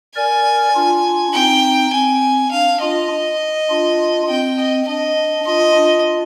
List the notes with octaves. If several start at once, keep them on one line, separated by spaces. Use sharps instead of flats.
A#4 D5 G#5
D4 F4
C4 D#4 G5
C4 G#5
D4 F5
D4 F4 D#5
D4 F4
C4 G5
D#5
D4 D#5
D4 F4 D#5
D4 F4